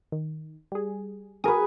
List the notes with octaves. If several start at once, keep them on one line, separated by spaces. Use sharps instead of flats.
D#3
G3 G#4
F#4 G#4 A#4 B4 D#6